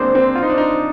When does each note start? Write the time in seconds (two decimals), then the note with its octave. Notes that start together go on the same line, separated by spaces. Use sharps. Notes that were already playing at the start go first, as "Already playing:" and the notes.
Already playing: G#3 A#3 C4 D4 C5
0.15 C4
0.35 F4
0.43 D#4
0.50 D4
0.58 D#4